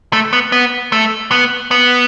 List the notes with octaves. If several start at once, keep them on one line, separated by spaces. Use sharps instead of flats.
A3
B3
B3
A3
B3
B3